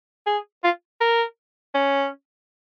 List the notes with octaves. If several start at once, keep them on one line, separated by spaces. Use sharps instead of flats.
G#4
F4
A#4
C#4